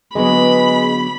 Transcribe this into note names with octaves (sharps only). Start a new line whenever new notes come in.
D3 F#3 G#3 B3 B5